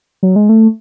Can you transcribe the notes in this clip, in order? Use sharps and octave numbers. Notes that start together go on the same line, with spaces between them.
F#3
G#3
A3